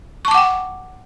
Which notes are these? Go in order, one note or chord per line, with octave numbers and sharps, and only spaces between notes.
F#5 G5 A5 C#6 D6